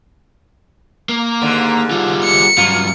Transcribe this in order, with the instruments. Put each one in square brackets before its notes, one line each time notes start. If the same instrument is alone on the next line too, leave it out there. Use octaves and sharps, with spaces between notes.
[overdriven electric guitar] A#3
[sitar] D#2 G#2 D3
[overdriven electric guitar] G3 F4
[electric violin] C#7
[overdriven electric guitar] G2 F#3 [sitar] F4